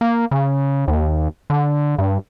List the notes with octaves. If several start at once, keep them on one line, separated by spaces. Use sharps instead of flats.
A#3
C#3
D#2
D3
G2